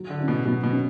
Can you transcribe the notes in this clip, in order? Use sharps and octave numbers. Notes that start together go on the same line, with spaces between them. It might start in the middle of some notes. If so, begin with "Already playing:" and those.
Already playing: F#3
D3
C#4 E4
B2
B2 F#3
B2
C#4